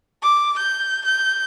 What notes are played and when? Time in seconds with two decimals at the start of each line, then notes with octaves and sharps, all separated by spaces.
0.22 D6
0.58 G6
1.04 G6